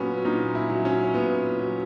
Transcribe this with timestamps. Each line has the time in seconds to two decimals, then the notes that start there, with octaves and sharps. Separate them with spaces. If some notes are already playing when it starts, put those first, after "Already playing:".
Already playing: A#2 F#3 B3 C#4
0.25 A#2 D#4
0.55 E4
0.70 F#3
0.85 C#4
1.14 A#2 B3
1.58 F#3